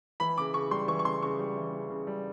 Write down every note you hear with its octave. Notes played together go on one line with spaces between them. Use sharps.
E3 B5
C#3 D6
C#3 C#6
G3 C6
E3 C#6
C#6
C#3 C6
C#3 C#6
G3
E3
C#3
C#3
G3